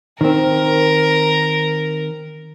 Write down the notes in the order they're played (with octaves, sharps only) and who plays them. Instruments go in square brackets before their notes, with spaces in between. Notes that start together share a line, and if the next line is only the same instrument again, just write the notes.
[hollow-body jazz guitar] D#3 C4 [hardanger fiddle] A#4